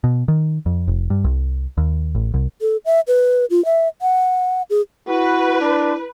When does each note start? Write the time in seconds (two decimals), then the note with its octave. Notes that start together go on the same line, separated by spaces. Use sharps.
0.04 B2
0.28 D#3
0.66 F2
0.88 F1
1.10 G2
1.24 C2
1.78 D#2
2.15 A1
2.34 C2
2.61 A4
2.85 E5
3.08 B4
3.50 F4
3.65 E5
4.02 F#5
4.70 G#4
5.09 E4 F#4 B4
5.61 D4